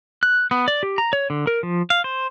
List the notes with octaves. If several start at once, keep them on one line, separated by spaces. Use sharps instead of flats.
F#6
B3
D5
G4
A#5
C#5
D3
A#4
F3
F5
C5